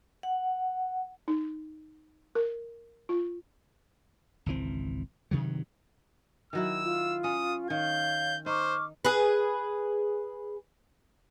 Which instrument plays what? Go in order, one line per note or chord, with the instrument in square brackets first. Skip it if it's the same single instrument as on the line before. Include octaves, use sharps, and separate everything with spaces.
[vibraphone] F#5
[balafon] D#4
A#4
F4
[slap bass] G#1 C#2 E3 C4
G2 C3 D#3 F#3
[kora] D#3 F#3 E4 [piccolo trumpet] E6
[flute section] F4
[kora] C#4 [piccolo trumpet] D#6
[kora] D#3 [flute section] C#5 F5 [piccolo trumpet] G6
[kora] D#4 [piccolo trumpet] C5 [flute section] C#6 D6 F6
[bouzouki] G#4 B4